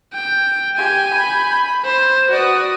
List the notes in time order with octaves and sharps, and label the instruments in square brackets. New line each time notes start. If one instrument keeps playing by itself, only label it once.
[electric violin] G5
[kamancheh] G4 [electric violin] G#5 G6
[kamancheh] B5
[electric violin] C5
[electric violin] F#4 D#6 [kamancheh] B4 D5